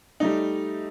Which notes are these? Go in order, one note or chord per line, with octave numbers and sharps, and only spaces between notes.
G3 A3 D#4